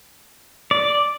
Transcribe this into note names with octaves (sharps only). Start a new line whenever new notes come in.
D5